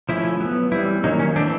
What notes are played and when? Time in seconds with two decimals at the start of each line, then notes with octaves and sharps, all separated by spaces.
0.09 F3 A3 C#4 E4
0.40 F#3 B3
0.72 E3 G3 C4 E4
1.04 D#3 F#3 A#3 C#4 D#4
1.19 C#4
1.36 E3 A3 C4 D4